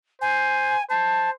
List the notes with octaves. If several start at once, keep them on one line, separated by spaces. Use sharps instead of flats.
C5 G#5
C5 A5